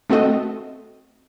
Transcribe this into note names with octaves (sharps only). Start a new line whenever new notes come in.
A3 C4 F#4 A4 D#5